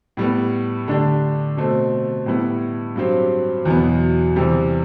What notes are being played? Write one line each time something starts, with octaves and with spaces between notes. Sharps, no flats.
A2 G3 B3
D3 A3 D4 G4
B2 A3 C4
A2 G3 B3 E4
G2 F#3 C4 G4
E2 B2 F#3 B3
E2 C3 G3